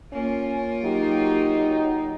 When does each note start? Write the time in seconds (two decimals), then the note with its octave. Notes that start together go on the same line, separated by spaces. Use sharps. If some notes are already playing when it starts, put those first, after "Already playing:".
0.12 A#3 C#4 F4
0.84 F#3 D#4 G4